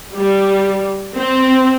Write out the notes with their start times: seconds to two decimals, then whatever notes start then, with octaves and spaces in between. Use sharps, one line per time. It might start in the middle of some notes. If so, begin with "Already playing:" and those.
0.15 G3
1.16 C4